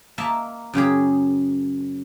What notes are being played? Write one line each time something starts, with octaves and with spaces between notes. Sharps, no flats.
A#3 D#5 E5 A5
F#2 C#3 G4 G#4